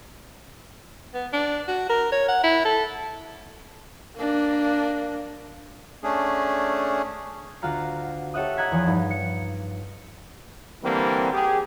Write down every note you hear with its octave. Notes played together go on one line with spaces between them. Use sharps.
B3
D4
F#4
A#4
C#5
F#5
E4
A4
A#3 D4
A3 C#4 D4 G#4
D2 F4 F#4 F5 A#5 C7
G4 A4 C#5 E5 F#5 D#6
D#5 F#5 A#5 G#6 B6
E2 F3
G2 D#4
C#7
D3 E3 G3 A#3 C4
G4 G#4